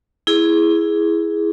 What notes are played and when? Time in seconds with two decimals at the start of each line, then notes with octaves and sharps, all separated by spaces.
0.27 E4 G#4